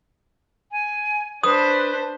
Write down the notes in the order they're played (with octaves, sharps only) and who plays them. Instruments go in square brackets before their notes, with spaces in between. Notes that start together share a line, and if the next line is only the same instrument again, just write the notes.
[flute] G#5
[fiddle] D4 C5 [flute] B4 [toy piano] D#6